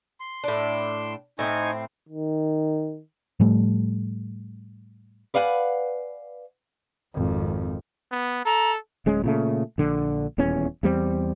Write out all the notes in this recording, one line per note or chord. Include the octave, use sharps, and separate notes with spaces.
C6
A2 D4
A2 C4 D#4 G#5 C#6
D#3
A2 F3 G3 A3
B4 D5 F5 F#5 G#5
G#1 F2
B3
A4 A#5
D1 G#3 C#4
A#2 C#3 A3
A#1 D3
D#1 E2 C#4
E2 G3 A#3 C4